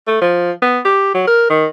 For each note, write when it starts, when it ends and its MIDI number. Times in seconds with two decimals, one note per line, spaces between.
0.07 0.18 57
0.21 0.52 53
0.62 0.79 59
0.85 1.10 67
1.14 1.26 54
1.27 1.47 70
1.50 1.66 51